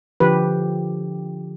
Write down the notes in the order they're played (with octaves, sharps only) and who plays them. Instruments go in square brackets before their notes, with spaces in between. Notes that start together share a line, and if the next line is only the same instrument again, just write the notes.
[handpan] D3 F3 G4 [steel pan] B4